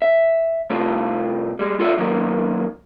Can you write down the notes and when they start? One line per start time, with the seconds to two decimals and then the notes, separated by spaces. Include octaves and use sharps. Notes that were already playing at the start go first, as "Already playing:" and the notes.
0.02 E5
0.70 A2 C3 A3 C4 F4
1.59 G3 G#3
1.80 F4 A4 C#5 D5 E5
1.98 F#2 D#3 F#3 A#3